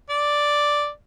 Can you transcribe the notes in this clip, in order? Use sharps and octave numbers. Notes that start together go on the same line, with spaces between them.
D5